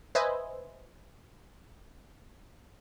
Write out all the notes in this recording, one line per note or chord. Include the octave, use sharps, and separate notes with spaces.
B4 C5 D#5 E5 G#5